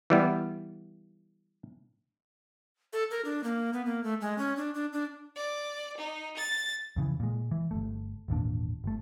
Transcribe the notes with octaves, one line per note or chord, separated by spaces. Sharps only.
E3 G3 B3
A4
A#4
D4
A#3
B3
A#3
A3
G#3
C#4
D4
D4
D4
D5
D#4
A6
F2 C#3 E3
A#2 G#3
E3
G1 C#2 A3
G#1 E2 A#2 D4
G1 A3